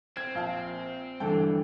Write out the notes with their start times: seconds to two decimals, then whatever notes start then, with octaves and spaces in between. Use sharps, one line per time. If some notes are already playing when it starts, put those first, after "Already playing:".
0.17 C4 G#6
0.35 A#1 F5 A5
1.20 G2 D3 E3 A4 G5